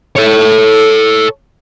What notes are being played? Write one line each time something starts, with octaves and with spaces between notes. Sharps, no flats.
A4 C#5